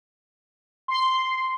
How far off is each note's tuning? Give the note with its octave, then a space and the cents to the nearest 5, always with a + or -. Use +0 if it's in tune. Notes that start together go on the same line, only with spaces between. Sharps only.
C6 -5